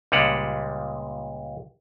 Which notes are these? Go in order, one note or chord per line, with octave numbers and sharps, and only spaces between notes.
C#2 A#2 G3 G#3 F#5